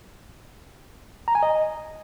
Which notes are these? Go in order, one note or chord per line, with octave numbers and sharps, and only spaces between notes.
A#5
G#5
D#5